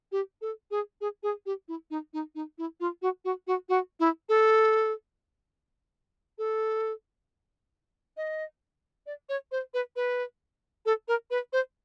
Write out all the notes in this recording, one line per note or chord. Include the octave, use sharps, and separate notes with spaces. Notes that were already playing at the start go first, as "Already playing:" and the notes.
G4
A4
G#4
G#4
G#4
G4
E4
D#4
D#4
D#4
E4
F4
F#4
F#4
F#4
F#4
E4
A4
A4
D#5
D5
C#5
C5
B4
B4
A4
A#4
B4
C5